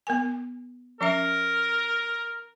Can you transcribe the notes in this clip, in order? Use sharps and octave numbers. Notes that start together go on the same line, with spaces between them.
B3 A#4 G#5
F3 C#4 A#4 E5